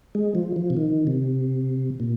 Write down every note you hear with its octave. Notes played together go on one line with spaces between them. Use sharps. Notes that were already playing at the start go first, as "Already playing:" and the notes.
G#3
F3
F3
C3
D#3
C3
A#2